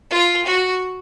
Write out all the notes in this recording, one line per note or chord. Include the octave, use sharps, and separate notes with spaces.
F4
F#4